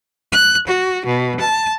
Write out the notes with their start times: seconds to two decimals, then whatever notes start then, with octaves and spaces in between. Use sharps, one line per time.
0.33 F#6
0.68 F#4
1.05 B2
1.40 A5